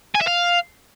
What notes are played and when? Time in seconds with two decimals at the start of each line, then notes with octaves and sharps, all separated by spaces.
0.15 G#5
0.21 E5
0.28 F5